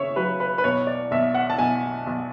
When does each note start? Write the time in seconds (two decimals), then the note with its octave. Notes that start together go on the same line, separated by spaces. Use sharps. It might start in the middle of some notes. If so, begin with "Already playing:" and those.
Already playing: C#3 C#5 E5
0.16 F#3 B4
0.40 B4
0.58 B4
0.64 B1 C#5
0.87 D5
1.11 B1 E5
1.34 F#5
1.50 A5
1.58 B1 G#5
2.07 B1